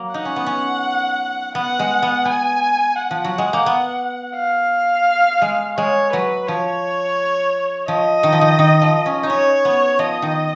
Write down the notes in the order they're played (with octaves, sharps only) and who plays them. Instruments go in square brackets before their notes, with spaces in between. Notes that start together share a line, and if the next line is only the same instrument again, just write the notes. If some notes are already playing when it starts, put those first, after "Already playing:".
Already playing: [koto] F#3 A#3
[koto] D#4 [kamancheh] F#5
[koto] C#4
B3
C#4
[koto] B3 [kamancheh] F#5
[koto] G#3
B3
[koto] B3 [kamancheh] G#5
[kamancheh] F#5
[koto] F3
F#3
G#3
A#3
B3
[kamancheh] F5
[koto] G#3
[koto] G#3 [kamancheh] C#5
[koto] F#3 [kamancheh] B4
[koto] F3 [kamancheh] C#5
[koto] F3 [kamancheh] D#5
[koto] D#3
F3
D#3
D#3
F3
C#4
D#4
[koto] C#4 [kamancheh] C#5
[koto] B3
[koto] F3 [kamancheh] D#5
[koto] D#3